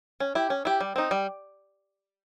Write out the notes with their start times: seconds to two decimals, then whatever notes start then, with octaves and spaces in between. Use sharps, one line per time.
0.20 C#4
0.35 E4 G4
0.50 C#4
0.65 E4 G4
0.80 G3
0.96 C4 D#4
1.11 G3